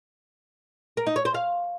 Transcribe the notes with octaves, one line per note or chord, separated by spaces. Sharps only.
A#4
D#4
C#5
C5
F5